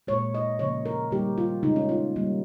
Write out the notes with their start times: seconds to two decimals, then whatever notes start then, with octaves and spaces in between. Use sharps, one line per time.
0.07 A#2 G#3 C#5
0.34 D#5
0.59 C#3 F3 A#3 C#5
0.86 A#4
1.11 D#3 G3 A#3 G4
1.38 F4
1.63 C#3 G#3 D#4
1.76 C#4
1.89 F4
2.16 D#3 G3 A#3